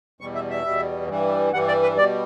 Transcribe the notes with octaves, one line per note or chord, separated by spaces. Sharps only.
E2 B2 G3 C#6
E5
E5
E2 B2 G3
G2 E3 G3
G2 E3 G3 F#5
D5
B4
B2 G3 D5